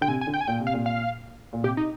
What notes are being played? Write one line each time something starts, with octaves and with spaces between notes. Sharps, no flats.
D3 G5
C3 G#5
G#5
D3
G5
G#5
A#2 G5
C3
F5
A#2
F5
A#2
C3 G4
D#4